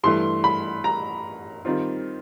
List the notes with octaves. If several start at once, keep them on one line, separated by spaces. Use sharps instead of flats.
G2 E3 A3 C6
B5
A#5
D#3 G3 C4 F4